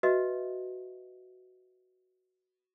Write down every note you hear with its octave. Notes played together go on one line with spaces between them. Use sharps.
F#4 B4 D#5 E5